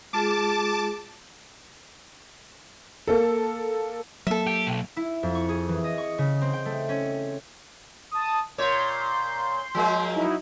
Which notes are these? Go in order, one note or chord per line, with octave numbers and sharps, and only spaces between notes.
G#3 F4 G#4 A5 D6
A#3 A4
F#3 A#3 A4 E5
G4
B1
E4
F2
C#6
G#4
E3
D#5
C#6
C#3
C4
G5
A3
C#4
A5 D#6
A#2 C#5 C6 G6
F3 G#3 A#3
F#3 D#4 E4